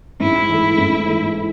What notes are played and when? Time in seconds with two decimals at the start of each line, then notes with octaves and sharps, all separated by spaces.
0.20 G#2 E4
0.49 E3 A3
0.78 G#2
1.07 E3 A3